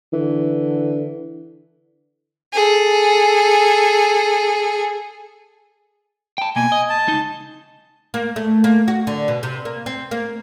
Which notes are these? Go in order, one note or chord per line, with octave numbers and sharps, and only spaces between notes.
D3 E3
G#4 A4
G5 A5
B2 A#3 G#5
D#5
A5
C#2 D#4
A#3
A3
A#3
F#4
D3
B2
C3
A#3
C4
A#3